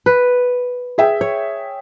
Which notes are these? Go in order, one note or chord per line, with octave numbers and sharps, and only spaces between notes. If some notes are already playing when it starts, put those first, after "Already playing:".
B4
G#4 E5 G5
C#5